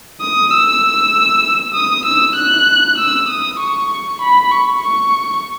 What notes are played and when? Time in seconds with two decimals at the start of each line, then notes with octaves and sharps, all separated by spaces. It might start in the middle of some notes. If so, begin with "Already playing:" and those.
0.21 D#6
0.51 E6
1.74 D#6
2.05 E6
2.36 F#6
2.98 E6
3.29 D#6
3.60 C#6
4.22 B5
4.51 C#6
4.82 C#6